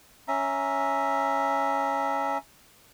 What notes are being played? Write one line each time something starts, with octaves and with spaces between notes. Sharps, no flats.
C#4 E5 A#5